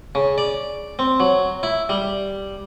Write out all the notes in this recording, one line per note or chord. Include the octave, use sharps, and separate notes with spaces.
C#3
D5
C4
F#3
E4
G3